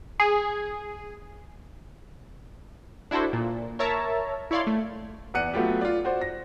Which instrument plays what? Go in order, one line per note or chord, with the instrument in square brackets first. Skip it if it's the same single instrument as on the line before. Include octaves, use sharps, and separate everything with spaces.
[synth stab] G#4
[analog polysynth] D4 E4 F#4 A4 C5
A#2
A#4 C#5 E5 A5 A#5
E4 C#5 D5 F5 C6
A3
[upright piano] E2 D5 F#5 F#6 C#7 D#7
F#3 A3 B3 F4 G4
F4 D5
F#4 C5 D5
A#6